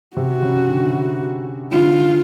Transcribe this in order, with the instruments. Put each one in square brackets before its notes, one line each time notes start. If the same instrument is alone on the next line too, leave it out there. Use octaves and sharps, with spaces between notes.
[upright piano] C3 [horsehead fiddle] F#4
[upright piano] C#3
D3
[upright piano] D3 [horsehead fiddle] F4